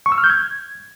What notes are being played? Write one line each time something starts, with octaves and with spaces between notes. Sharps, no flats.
C#6
E6
F6
G6
G#6